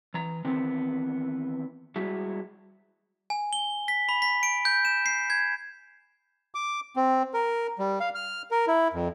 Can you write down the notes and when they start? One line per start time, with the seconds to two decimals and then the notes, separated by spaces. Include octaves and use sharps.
0.14 E3 A#5
0.45 D#3 E3 B3 C4
1.96 G3 G#3 E4 F#4
3.30 G#5
3.53 G7
3.88 B6
4.09 B5
4.22 B6
4.43 D7
4.65 G6
4.85 E7
5.06 C7
5.30 G#6
6.55 D6
6.96 C4
7.34 A#4
7.79 G3
8.00 F5
8.15 F6
8.51 A#4
8.68 E4
8.93 F2